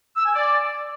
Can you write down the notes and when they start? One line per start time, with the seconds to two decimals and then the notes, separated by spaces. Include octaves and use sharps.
0.17 E6
0.26 G#5
0.35 D5